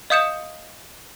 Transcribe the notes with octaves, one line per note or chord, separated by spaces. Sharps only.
D#5 F5 D#6 G6 C#7 E7